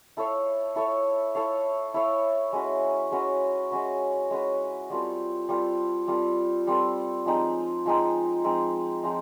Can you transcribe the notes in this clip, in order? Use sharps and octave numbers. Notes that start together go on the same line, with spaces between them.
E4 A4 C#5 F5
E4 A4 C#5 F5
E4 A4 C#5 F5
E4 A4 C#5 F5
G#3 C#4 F#4 B4
G#3 C#4 F#4 B4
G#3 C#4 F#4 B4
G#3 C#4 F#4 B4
G3 C4 F4 A4
G3 C4 F4 A4
G3 C4 F4 A4
G3 C4 F4 A4
F3 G#3 C4 D#4
F3 G#3 C4 D#4
F3 G#3 C4 D#4
F3 G#3 C4 D#4